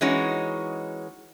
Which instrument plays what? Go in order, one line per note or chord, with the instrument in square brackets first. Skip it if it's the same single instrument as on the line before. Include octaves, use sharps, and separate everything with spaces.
[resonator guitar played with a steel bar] E3 G#3 C#4 D#4 F#4